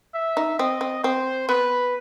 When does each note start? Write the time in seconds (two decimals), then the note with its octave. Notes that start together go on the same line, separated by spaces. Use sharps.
0.14 E5
0.37 D#4
0.59 C4 D#5
0.81 C4
1.04 C4 C5
1.49 B3 B4